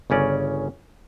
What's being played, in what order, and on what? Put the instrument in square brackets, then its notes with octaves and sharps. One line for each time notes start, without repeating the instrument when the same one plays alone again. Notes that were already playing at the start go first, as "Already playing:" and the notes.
[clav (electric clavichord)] G1 C#3 C#4 D5